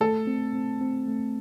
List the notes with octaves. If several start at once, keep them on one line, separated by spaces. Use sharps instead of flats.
A3 A4
C4
C4
C4
A3